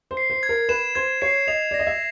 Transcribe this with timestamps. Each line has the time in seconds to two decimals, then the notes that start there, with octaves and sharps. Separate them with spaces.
0.11 C5
0.17 C7
0.30 C5
0.43 G#6
0.49 A#4
0.69 B4 E7
0.95 C5 G#6
1.22 C#5 C7
1.47 D#5 F7
1.71 D5
1.74 A#6
1.79 D#5
1.87 E5